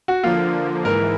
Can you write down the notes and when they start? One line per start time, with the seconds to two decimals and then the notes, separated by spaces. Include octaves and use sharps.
0.08 F#4
0.23 D3 F3 A#3 F4
0.85 G#2 E3 A#4